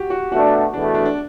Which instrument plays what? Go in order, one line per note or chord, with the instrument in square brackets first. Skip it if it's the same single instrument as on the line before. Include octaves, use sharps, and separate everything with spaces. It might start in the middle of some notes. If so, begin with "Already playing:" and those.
Already playing: [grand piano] F#4 G4
F#4
[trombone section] B2 A3 D4 [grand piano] F#4
[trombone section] E2 B2 A3 [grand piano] D4
[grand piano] D4
D4